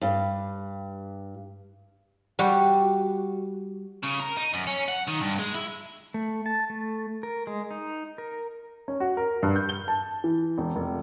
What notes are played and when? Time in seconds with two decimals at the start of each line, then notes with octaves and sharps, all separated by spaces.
0.01 G2
2.39 G3 F#4 G4
4.03 C#3
4.20 A#4
4.37 D#4
4.54 F#2
4.67 C#4
4.88 F#5
5.07 D#3
5.21 G2
5.39 G#3
5.55 E4
6.14 A3
6.46 A5
6.70 A3
7.23 A#4
7.47 G#3
7.71 D#4
8.18 A#4
8.88 C#4
9.00 F#4
9.17 A#4
9.43 G2
9.56 G6
9.69 G7
9.88 A5
10.24 E3
10.58 E1
10.76 F1